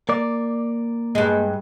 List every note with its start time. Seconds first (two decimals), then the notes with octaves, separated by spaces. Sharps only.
0.09 A#3 D5
1.15 G2 G#3